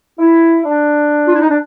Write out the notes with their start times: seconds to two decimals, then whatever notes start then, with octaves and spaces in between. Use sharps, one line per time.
0.19 E4
0.65 D4
1.26 F4
1.34 E4
1.41 D#4
1.49 D4